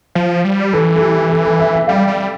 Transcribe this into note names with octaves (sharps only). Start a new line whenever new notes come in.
F3
G3
E3 A4
A4
G4
A4
A4
E5
E5
G3 F5
G3